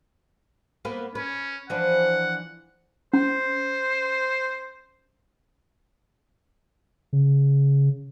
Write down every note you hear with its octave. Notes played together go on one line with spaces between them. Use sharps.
A#3 B3 B4
C#4 B4
E3 F3 D4 F#5
C#4 C5
C#3